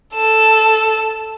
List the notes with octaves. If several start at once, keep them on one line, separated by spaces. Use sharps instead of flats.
A4 E7